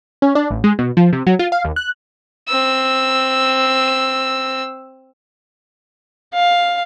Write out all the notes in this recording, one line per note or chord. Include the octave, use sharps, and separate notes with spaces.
C#4
D4
A1
G#3
B2
F3
C3
F#3
F4
F5
D#2
F#6
C4 E6
F5